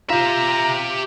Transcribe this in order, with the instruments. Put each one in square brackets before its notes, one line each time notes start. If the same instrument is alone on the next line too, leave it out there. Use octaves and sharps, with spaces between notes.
[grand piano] F4 [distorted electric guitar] G4 E5 [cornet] A#5